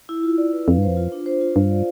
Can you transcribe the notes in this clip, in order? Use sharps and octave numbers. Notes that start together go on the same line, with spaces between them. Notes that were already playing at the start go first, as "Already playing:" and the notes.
E4
F4
D5
B4
F2 F5
G2 C5
F2
F4
D4
C5
F4
G2 F5
D5